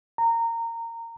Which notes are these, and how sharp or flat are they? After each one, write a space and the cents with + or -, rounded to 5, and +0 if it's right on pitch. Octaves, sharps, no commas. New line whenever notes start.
A#5 -20